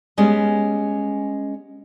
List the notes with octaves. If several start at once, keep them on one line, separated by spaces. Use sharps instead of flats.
G3 G#3 B3 C#4